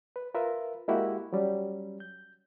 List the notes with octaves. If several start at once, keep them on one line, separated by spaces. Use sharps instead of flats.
B4
F4 A#4 B4 E5
G#3 A#3 E4 F#4 G4
F#3 G3 C#4
G6